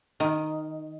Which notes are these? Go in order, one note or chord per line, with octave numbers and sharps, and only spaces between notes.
D#3